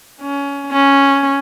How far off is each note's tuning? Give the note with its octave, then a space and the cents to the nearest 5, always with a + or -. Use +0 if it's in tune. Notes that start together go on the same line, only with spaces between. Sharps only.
C#4 +20
C#4 +0